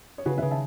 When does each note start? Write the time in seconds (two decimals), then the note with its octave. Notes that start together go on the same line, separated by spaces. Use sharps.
0.18 C#5
0.25 C#3 F#4 B4
0.37 B4 E5
0.42 C#3
0.51 E5 A5